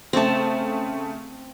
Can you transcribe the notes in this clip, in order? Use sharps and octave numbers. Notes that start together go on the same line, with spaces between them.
C#3 A3 C4 A5